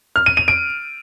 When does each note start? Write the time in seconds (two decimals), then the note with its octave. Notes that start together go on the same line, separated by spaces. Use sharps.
0.16 F6
0.26 D#7
0.37 D#7
0.48 D7